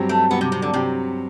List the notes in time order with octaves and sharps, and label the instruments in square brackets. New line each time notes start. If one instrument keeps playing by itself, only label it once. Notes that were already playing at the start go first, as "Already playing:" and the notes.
Already playing: [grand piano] G2 F#3 C4 G4
[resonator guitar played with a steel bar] A3
[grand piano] G2 F#3 C4 G4 [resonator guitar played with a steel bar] B3
[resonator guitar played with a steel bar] C3
C3
D3
[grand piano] G2 F#3 C4 G4 [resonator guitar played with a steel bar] C3